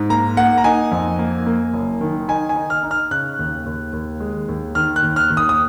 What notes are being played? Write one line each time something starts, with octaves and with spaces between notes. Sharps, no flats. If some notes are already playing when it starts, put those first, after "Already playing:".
Already playing: G#2
A#3 A#5
A#3 F#5
A#5
D#4 G#5
F2
A#3
A#3
F#1
D#3
D#4 G#5
G#5
D#4
F6
D#4
F6
C#3 F#6
D#2
D#2
D#2
G#3
D#2
D#3 F6
F#6
D#2
F6
D#2
D#6
D#6